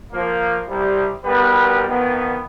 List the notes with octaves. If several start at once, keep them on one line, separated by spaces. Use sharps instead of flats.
F3 A#3
C2 C3 G3
B1 G3 B3 A#4 B4
F2 D#3 B3